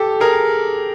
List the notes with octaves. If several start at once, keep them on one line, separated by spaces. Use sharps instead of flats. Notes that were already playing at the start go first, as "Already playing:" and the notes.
Already playing: G4 A4
G#4 A#4